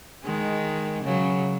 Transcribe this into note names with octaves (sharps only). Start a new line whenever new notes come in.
D#3 G#3
C#3 F#3